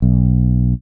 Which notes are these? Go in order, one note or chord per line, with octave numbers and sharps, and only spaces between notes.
B1